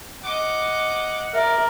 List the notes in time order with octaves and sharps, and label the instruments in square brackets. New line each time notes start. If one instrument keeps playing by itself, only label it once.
[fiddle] D#5 D6 [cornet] F#5
[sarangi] A#4 [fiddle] D5 [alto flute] E5